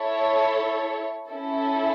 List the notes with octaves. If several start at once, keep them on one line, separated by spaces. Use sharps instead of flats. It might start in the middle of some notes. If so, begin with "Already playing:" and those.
Already playing: E4 A4 C#5
C#4 E4 A4